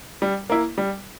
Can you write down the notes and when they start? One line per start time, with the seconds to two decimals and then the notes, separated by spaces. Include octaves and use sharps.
0.22 G3
0.50 A#3 E4
0.78 G3